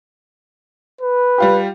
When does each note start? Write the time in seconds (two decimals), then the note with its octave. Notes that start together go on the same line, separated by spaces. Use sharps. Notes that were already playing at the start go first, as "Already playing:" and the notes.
1.01 B4
1.38 G3 F4 G4